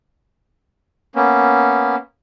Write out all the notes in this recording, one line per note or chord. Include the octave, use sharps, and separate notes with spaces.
A#3 B3 C#4